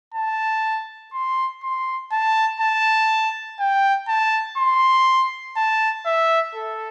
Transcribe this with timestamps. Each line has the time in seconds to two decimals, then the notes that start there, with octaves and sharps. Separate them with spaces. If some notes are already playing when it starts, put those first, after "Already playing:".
0.14 A5
1.13 C6
1.63 C6
2.12 A5
2.60 A5
3.60 G5
4.08 A5
4.58 C6
5.57 A5
6.06 E5
6.55 A4